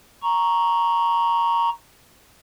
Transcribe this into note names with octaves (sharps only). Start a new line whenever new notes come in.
A#5 C#6